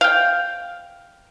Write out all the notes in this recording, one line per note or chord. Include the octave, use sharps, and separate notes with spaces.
F5 G5